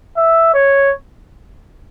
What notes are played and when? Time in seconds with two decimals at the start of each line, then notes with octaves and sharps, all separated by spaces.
0.17 E5
0.54 C#5